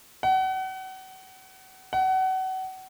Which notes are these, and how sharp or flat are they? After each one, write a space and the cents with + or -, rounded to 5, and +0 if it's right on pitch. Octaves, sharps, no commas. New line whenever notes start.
F#5 +35
F#5 +30